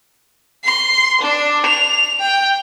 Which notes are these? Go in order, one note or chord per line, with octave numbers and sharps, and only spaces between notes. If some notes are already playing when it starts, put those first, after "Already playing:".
C6
D4
F7
G5